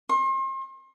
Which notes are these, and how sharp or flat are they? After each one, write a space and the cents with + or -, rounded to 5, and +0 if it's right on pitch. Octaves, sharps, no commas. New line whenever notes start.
C6 +40